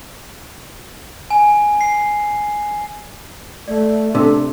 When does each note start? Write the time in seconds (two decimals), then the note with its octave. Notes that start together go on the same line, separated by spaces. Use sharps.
1.31 G#5
1.81 C7
3.68 A3 D5
4.15 C3 D4 A4 E6